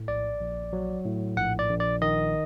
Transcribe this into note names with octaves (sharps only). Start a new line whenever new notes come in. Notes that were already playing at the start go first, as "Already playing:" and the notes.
Already playing: A2
A#1 D5
A#1
F#3
A2
A#1 F#5
D5
A#1
D5
D#3 D#5